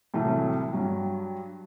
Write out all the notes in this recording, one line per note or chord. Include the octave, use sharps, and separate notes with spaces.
C2 A2 C3 E3 F#3 A3
G2 F#3